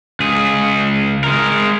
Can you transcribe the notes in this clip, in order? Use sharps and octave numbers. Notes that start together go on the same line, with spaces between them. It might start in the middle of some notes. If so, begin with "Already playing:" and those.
C#2 G#4
G#3 A#4